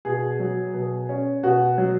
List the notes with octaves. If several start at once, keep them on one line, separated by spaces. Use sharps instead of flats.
B2 G#4
F#3
B2
C#4
B2 F#4
F#3